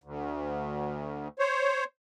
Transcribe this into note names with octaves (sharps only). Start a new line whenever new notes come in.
D2
C5 C#5